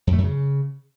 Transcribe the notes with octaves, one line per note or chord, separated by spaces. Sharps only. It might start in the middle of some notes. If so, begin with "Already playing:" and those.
F2
A3
F#2
C#3